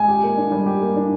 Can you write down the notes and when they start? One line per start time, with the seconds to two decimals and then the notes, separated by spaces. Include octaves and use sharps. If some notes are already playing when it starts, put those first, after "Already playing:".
Already playing: G#3 G#5
0.09 G4
0.23 A#3
0.38 D4
0.52 G3
0.66 G4
0.82 A#3
0.96 D4